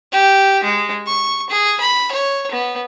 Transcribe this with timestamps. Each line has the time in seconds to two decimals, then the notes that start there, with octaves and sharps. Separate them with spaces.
0.12 G4
0.64 G#3
1.06 C#6
1.50 G#4
1.80 B5
2.12 C#5
2.51 B3